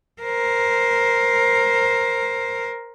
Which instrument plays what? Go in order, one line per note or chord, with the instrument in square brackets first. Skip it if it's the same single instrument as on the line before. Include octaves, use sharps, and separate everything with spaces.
[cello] A#4 C5